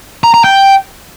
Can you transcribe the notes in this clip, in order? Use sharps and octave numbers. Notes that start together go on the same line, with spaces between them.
A#5
A#5
G5